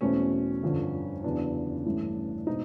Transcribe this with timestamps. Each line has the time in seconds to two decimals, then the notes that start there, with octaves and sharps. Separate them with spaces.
0.01 E2 B2 F#3 A3 C4 C#4
0.63 G1 F2 D3
1.24 F#1 E2 C#3 F#3 B3 D4
1.85 A1 G2 E3 A3
2.47 B2 G#3 C4 D#4